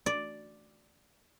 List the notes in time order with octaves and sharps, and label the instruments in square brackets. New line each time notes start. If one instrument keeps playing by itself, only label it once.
[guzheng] D5